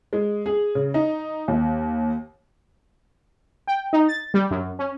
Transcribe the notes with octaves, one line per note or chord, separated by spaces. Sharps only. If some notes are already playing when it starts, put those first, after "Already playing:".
G#3
G#4
C#3
D#4
D#2
G5
D#4
A6
G3
F#2
C#4